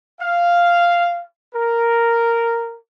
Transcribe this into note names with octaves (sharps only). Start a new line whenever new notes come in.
F5
A#4